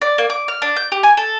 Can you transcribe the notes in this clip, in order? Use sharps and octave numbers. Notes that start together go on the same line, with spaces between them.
D5
A#3
D6
F6
D4
G6
G4
G#5
A4